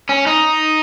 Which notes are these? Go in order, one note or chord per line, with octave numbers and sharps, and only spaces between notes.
C#4
D#4